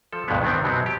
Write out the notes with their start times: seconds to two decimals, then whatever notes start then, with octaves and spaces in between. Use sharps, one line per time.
0.13 F3 A4
0.28 D2 G2 B2 F3 G#3 B3
0.43 D#3 B3 C4 D4
0.63 F#2 B2 F#3 B3 C4
0.86 G4